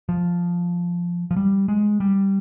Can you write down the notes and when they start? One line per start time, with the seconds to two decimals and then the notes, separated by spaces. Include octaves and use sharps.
0.09 F3
1.31 F3
1.36 G3
1.68 G#3
2.00 G3